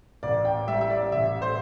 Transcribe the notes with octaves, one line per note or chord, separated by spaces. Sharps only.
A1 D5
G5
G3 E5
E5
D5
A1 E5
C5